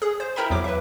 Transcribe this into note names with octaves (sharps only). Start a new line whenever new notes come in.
G#4
C5
E4 A#4 E5 G5 A#5 B5
E2 F#3 D6
B4 E5